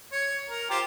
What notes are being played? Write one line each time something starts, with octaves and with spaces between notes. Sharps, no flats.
C#5
A#4
F4 G4 C5